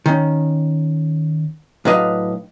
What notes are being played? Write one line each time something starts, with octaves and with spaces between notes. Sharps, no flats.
D#3 C#4
A2 F#3 D4 B4 D#5 F5